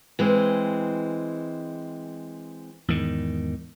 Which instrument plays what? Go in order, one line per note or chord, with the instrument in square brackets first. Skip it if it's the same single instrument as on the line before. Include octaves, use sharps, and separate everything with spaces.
[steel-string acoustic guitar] E3 G#3 C4
[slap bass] E2 G#2 D#3